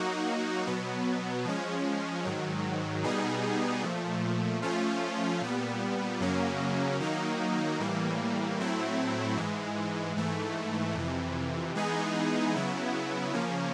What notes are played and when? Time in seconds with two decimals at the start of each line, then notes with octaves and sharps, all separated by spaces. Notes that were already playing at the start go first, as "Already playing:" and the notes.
Already playing: F#3 A#3 D#4 F#4
0.67 B2 F#3 B3
1.45 F3 G#3 C#4
2.25 G#2 D#3 F#3
3.04 B2 G3 B3 D#4 G#4
3.83 A#2 F3 A3
4.62 F3 A3 C#4 F4
5.41 A#2 G3 B3
6.20 F#2 C#3 F#3 A#3 C#4
7.00 D#3 F#3 A#3 D#4
7.80 A2 E3 G3 A#3
8.58 A2 F#3 A3 C4 E4
9.37 G#2 E3 G#3
10.16 G#2 E3 A3
10.95 F2 C3 E3
11.75 E3 G#3 B3 D#4 G#4
12.54 C#3 F#3 B3 E4
13.33 C#3 F3 A#3 C#4